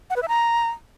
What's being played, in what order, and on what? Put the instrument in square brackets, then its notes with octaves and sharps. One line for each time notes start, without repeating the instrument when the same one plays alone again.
[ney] F#5
B4
E5
A#5